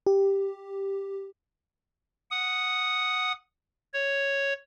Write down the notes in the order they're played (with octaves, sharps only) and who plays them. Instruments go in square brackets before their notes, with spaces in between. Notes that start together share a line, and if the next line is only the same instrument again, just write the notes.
[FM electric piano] G4
[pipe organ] F#5 D#6
C#5